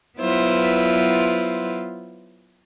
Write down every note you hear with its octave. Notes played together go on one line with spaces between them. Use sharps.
F#3 B3 E4 F4 B4 C5